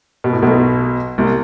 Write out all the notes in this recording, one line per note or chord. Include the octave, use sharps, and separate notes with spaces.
B2
A2
B1 B2
C2 C3